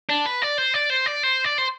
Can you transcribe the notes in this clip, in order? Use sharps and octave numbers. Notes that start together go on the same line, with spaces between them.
D4
B4
D5
C5
D5
C5
D5
C5
D5
C5